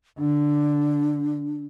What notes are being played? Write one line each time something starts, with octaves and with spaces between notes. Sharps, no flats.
D3 D4